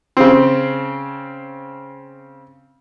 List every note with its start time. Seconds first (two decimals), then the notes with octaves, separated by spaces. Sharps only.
0.17 C#3 C4